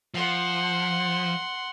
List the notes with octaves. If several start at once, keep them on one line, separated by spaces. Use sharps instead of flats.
F3 F#5 C6